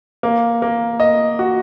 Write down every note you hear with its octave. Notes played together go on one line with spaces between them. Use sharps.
A#3
A#3
D#5
F#4